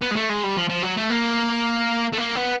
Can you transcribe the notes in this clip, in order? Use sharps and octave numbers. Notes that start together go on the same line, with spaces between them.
B3
G#3
A3
G#3
G3
F3
F3
F#3
A3
A#3
A3
A#3
B3